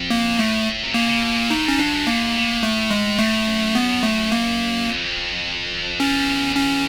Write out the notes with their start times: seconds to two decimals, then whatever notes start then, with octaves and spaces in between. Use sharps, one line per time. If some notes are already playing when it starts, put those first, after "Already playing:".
Already playing: F2
0.10 A#3
0.39 A2 A3
0.83 C3
0.94 C#3 A#3
1.08 C#3
1.23 B2
1.36 A#2
1.50 A2 D#4
1.65 F2 C#4
1.79 F2 D4
1.93 F#2
2.07 G#2 A#3
2.35 A2
2.63 A3
2.91 G#3
3.19 A2 A3
3.47 F#2
3.75 B3
4.03 A3
4.32 A#3
4.88 F2
6.00 E2 C#4
6.56 C#4